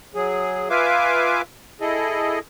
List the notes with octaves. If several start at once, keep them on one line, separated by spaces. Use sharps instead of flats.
F#3 G#4
F4 B4 E5 F5 G#5 D6
E4 G#4 A4 D#5